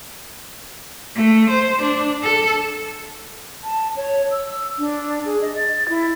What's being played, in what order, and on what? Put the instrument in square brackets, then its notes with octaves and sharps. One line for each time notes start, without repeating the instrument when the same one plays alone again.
[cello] A3
C5
D4
A4
[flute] A5
C#5
E6
D4
G#4
D#5
A6
E4